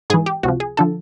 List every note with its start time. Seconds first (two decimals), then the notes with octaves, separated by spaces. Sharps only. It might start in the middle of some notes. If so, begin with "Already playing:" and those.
0.10 G#2 E3 G#4
0.26 G4
0.43 C#2 C3 F3 F#4
0.60 G#4
0.77 D3 F3 A4